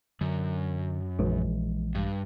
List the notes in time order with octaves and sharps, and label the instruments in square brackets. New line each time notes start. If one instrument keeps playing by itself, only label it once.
[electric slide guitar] F#2 [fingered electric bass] D3
[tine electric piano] A#1 [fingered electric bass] E3 G#3
[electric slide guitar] G2